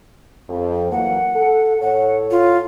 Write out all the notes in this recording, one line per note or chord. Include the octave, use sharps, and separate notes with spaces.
F2
E3 F#3 A#3 F#5
A4
A2 A4 C#5 F#5
F4